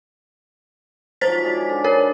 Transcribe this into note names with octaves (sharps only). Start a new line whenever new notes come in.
G#2 F3 F#3 C5 A6 B6
G#4 D5 D6
D3
A#4 C#5